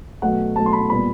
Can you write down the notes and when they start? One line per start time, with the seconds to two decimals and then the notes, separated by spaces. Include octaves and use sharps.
0.22 B2 F#3 A3 F#5
0.56 B2 F#3 A3 A5
0.66 C6
0.73 B5
0.89 A#2 G3 B3 B5